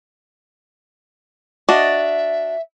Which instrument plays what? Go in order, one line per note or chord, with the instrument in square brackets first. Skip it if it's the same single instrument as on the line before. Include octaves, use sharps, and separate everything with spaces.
[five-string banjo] D4 F#4 D#5 [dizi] E5